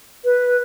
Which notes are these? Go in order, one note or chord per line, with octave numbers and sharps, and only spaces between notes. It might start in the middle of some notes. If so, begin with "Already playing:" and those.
B4